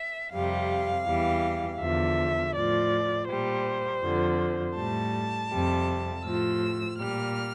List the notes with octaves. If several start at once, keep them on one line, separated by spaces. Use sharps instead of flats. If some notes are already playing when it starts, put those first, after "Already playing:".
Already playing: E5
F2 C3 G3 F5
E2 E3 G3
E2 D3 F3 E5
A2 F3 D5
A#2 G3 C5
F2 D3 F3
A2 G3 A5
F2 C3 G3
A2 F3 E6
A#2 G3 F6